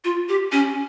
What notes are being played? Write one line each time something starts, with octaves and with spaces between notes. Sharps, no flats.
F4
G4
C#4